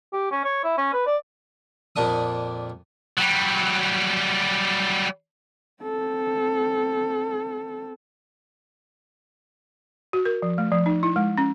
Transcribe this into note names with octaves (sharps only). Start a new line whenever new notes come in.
G4
C#4
C#5
E4
C#4
B4
D5
F2 A#2 A#3 D4 D#6
F#3 G3
C4 A4
F#4
A#4
F3
A3
F3
D#4
E4
G#3
C#4